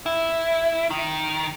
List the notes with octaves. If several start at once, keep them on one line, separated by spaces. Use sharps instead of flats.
E4
D#3